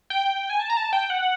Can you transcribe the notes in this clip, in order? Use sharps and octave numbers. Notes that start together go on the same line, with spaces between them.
G5
G#5
A5
A#5
A5
G5
F#5